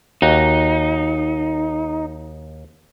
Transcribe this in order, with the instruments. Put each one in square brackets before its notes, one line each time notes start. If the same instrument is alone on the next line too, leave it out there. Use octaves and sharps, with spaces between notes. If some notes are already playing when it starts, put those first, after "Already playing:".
[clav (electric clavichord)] D#2 F#4 [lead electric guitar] D#4